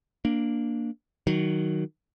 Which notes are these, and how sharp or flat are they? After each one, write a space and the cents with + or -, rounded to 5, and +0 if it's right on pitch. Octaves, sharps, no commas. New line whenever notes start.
A#3 +0 D4 +0
D#3 +0 F#3 +10